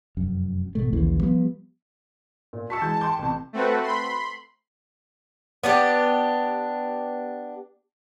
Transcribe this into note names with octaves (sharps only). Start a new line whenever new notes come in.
F1 F#2
G#1 B2 A3
A#1 D#2 C#3 E3
F3 G3 B3
A#2
F#4 A5 C#6 E6 B6 C#7
E3 G#3 G6
G5 C6 D6 G6
A1 C3
A3 C4 F#4 B4
B5 C6
B3 D4 G4